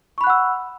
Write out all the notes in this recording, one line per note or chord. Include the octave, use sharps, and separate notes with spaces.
F#5 B5 C#6 E6 F#6